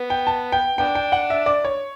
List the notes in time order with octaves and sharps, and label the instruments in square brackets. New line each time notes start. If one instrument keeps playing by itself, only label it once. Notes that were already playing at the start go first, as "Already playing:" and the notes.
Already playing: [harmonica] B3
[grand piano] G5
A5
G5
[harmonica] B3 D4 [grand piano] G5
[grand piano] G5
F#5
E5
D5
C#5